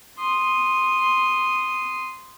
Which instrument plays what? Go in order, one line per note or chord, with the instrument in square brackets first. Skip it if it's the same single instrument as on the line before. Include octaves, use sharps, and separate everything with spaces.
[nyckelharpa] C6 D#6